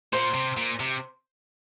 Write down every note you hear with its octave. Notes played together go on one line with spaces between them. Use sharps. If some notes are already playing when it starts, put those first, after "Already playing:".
A#2 C5
C3
A#2
C3